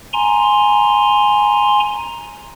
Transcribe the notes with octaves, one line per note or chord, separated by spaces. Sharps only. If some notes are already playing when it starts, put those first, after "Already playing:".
G#5 A#5 C6